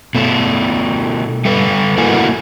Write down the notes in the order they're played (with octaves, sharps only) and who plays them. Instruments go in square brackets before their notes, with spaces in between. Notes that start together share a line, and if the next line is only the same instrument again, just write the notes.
[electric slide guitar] B2 A3
G3 A4 B4
A3 A#3 E4 F#4 A#4 G#5